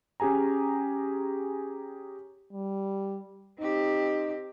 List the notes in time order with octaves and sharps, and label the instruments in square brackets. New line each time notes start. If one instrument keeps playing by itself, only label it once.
[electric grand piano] C#4 G4 G#4 G#5 A#5
[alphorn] G3
[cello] C4 G4 [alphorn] D#4